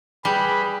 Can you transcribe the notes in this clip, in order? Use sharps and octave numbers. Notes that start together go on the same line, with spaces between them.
G3 G#4 B4 B5